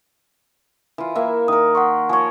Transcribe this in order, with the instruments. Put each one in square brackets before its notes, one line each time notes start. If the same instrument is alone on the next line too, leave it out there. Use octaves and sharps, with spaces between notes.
[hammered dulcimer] E3 F4
A#3 E4 E5
[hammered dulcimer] D#3 A#4 [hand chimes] D#6
[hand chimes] F#5 C6 C#6
[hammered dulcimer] F3 C#5 [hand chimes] G#5 C#6